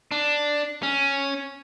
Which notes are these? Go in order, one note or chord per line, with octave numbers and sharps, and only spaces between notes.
D4
C#4